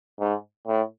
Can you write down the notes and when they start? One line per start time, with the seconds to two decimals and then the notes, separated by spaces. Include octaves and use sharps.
0.20 G#2
0.67 A2